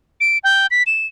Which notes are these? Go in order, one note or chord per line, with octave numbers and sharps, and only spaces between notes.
D7
G5
B6
E7